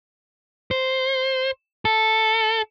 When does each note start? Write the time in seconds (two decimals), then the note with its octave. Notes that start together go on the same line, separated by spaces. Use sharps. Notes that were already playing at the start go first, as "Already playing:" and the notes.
0.71 C5
1.85 A4